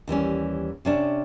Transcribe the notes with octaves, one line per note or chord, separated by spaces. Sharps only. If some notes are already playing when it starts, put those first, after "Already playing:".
D#2 E3 G3 C#4
C3 C#4 D4